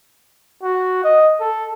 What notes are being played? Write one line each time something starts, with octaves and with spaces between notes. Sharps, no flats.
F#4
D#5
A4